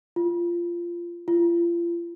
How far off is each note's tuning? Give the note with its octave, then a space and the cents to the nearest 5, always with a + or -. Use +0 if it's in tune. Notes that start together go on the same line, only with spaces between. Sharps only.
F4 -15
F4 -35